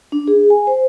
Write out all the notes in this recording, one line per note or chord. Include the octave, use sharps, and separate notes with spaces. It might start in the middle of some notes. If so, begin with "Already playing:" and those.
D4
G#4
G#5
C5